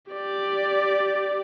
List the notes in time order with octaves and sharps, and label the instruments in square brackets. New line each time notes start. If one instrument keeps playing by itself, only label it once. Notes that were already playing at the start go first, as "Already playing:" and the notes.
[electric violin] G4 D5